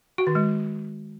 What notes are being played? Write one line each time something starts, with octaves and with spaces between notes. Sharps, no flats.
F#4
D#3
G#3